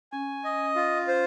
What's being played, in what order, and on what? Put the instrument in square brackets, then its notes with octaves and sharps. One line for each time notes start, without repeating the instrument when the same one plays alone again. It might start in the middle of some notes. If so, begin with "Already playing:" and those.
[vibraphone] C#4 [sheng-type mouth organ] G#5
[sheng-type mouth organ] D#5
F4
C5